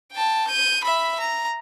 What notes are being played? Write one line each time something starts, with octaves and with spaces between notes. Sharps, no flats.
G5 A5
G6 D#7
E5 B5
A#5